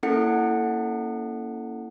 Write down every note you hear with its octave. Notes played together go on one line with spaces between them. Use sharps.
A#3 C#4 E4 A4 F#5 C#7